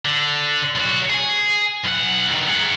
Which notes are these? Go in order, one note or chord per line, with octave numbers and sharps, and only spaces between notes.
D3
B1 F#4
G#4 G#5
B1 F#5
G2 D#3
G#4 F#5